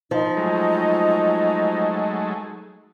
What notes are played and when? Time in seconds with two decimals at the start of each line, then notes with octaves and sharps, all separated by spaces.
0.11 F3 D#4
0.37 F#3 G#3 A3